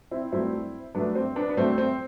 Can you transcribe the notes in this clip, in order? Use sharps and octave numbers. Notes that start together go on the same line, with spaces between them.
C4 E4
G2 F#3 A3 C4 E4
G2 F#3 A3 B3 D4
C4
B3 D4
B3
G2 F#3 A3 C4
C4